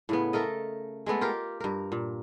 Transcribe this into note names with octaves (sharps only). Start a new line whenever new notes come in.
A2 C#3 B3
A3 A4 A#4 D#5
G#3 A3 B3 A4
F4 G4 A#4
G2 A#4
A#2